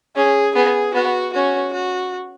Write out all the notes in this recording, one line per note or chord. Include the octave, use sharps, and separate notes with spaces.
C#4 G#4
B3 G#4
B3 F#4
C#4 F#4
F#4